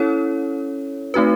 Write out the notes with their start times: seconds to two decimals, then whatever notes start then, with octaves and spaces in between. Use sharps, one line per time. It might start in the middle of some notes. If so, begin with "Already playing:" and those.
Already playing: C#4 E4 A4 C#5
1.14 A3 C4 D#4 F#4 B4